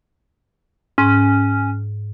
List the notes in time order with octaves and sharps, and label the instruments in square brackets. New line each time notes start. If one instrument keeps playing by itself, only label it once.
[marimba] G#2 [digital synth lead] C#4